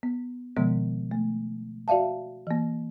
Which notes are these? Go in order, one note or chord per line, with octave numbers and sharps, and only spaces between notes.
B3
B2 D#3 F3 G#3 B3
A3
F#4 D5 E5 F5 A5
E3 A#3